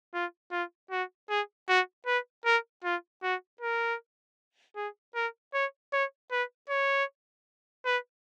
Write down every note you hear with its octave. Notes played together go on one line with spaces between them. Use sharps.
F4
F4
F#4
G#4
F#4
B4
A#4
F4
F#4
A#4
G#4
A#4
C#5
C#5
B4
C#5
B4